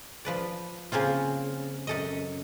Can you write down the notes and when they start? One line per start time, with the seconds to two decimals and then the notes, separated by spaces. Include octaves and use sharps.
0.25 F3 B4 D5
0.92 C#3 A#3 C4 F4
1.87 F#2 A4 D#5